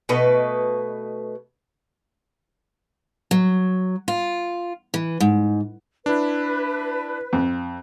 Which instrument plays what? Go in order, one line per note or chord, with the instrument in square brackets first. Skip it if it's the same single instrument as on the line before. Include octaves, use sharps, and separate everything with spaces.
[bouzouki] B2 A3 B4 D#5
[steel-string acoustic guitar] F#3
F4
E3
G#2
[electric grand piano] D4 E4 [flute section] B4
[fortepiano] F2